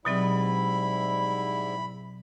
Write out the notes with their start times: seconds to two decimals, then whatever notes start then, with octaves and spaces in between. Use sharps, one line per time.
0.05 G#2 B2 F#3 G3 C4 E4 B5